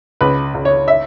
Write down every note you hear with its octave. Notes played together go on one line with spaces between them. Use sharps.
C#2 B4
C#2
C#5
E5